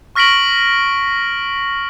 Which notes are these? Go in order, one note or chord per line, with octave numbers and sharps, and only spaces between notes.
C#6 F6 A#6 B6 D7 F#7